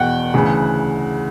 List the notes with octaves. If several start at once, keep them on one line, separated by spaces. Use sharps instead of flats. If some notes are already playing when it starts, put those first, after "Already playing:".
Already playing: E2 B2 F#5 G5
D2 C#3 E3